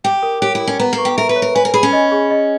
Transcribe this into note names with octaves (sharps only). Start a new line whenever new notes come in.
G4 G5
A#4
G4 C#5
E4
A#4
C#4
B3 A#5
A#3
C#6
G4
A#4 E5
B4
C#5
A#4
B4 G#5
A#4
G#4 B5
C#4
D#5
G#4
D#5